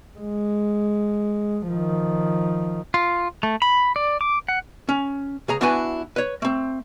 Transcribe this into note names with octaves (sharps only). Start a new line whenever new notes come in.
G#3
D#3 F3
F4
A3
B5
D5
D6
F#5
C#4
C#2 G#4 A#5
B3 D4 E4 F#4 B4 G#5
B4 C#5
A3 C4